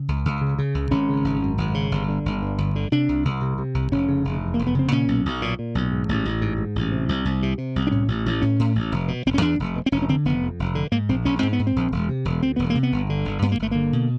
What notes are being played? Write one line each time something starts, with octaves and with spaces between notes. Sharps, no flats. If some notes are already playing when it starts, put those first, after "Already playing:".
Already playing: C#3
C#2
C#2
C#3
C#3
C#2
G#1 C#4
C#3
G#1
F#2
G#1
C#3
G1
D3
G1
G2
G1
D3
C3 D4
C2
C2
C3
C3
C2
F1 C#4
C#3
F1
E2
F1 A#3
B3
C#3 C4
A#2 C#4
B1
B1
A#2
A#2
B1
G#2
A1
A1
G#2
G#2
A1
C3
C2
C2
C3
C3
C2
D4
A2 C#4
A1
A1
A2 C#4
A2
A1
F1
B2
F1 C4
C#4
E2 D4
F1
B2
C4
F1 C#4
C#4
D3 C4
F1 B3
F2
F1
D3
G#2 A#3
A#1 C4
A#1 C#4
G#2 C4
B3
G#2
C4
A#1
E1
C3
E1
D2 C4
E1 B3
A#3
C3
B3
G1
D3
G1
G2 B3
A#3
G1 A3
D3 A#3
B2